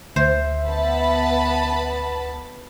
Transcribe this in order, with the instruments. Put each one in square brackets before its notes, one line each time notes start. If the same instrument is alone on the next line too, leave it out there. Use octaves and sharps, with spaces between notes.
[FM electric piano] D2 [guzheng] C5 [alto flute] E5
[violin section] B3 A5 B5